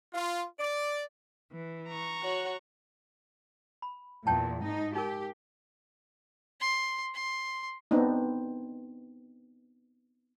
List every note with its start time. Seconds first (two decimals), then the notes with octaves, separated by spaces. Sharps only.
0.13 F4
0.59 D5
1.52 E3
1.88 A#5 C#6
2.22 F#4 C#5 F#5
3.82 B5
4.27 E2 A#2 C#5 G5 A5
4.63 G#2 D#4
4.95 D#4 G4 A#4
6.60 C6
7.14 C6
7.91 B3 C4 D4 D#4